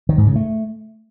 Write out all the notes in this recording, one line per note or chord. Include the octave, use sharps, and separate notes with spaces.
D#3
G#2
C#3
A3